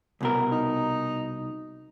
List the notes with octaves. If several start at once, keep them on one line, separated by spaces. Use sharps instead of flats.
C2 B2 A#4
D#4